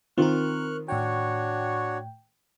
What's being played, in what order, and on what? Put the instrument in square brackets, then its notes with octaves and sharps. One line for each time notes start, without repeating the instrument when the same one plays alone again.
[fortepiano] D#3 F4 [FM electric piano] C4 A#4 [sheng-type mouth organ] C#6 F6 F#6
[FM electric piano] A2 G5 [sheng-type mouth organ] D4 F#4 C#5